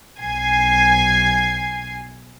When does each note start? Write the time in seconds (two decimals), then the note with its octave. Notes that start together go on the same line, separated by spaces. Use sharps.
0.20 B1 G#5 G#6 C7